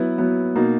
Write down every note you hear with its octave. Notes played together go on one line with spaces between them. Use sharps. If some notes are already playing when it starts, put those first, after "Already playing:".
Already playing: F#3 B3 E4 B4
F#3 B3 E4 B4
B2 A#3 D#4